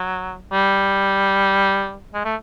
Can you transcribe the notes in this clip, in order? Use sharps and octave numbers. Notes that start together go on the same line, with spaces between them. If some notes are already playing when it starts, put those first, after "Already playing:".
Already playing: F#3
G3
G#3
A3